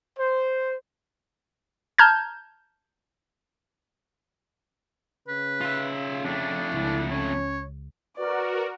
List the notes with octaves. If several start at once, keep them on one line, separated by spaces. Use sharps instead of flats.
C5
A5 A#5 F6 G6 G#6
C#3 B4
F4 E5
F2 A3 D4
C#2 E4
C#4 C#5
F#4 A#4 B4 D5